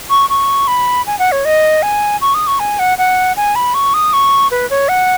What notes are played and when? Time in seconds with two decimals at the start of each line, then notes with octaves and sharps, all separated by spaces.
0.10 C#6
0.29 C#6
0.67 B5
1.07 G#5
1.19 F#5
1.32 C#5
1.45 D#5
1.82 G#5
2.21 C#6
2.34 D#6
2.47 C#6
2.59 G#5
2.79 F#5
2.98 F#5
3.37 G#5
3.55 B5
3.74 C#6
3.94 D#6
4.13 C#6
4.51 B4
4.70 C#5
4.89 F#5